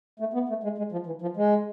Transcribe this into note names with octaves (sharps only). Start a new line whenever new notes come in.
A3
B3
A3
G#3
G#3
F3
E3
F3
G#3